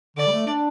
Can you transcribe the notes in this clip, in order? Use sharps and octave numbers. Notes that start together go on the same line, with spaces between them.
D3 D5
G3
A3
D4